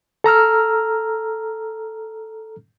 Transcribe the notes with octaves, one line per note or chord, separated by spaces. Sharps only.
A4 A#5 E6 F6